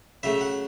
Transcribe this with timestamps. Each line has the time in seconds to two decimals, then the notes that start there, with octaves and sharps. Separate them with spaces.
0.23 C#3 F#3 A3 E5
0.41 F#5